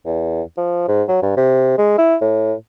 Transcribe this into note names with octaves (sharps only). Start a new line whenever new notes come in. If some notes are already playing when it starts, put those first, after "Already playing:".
E2
F3
G#2
F#3
G2
C3
G#3
E4
A2